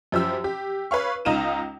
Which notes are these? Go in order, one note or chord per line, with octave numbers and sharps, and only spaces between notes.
F#2 F3 G4 E6
G4
B4 C#5 F5 C#6
C#2 D#4 F4 A#5 D#7 E7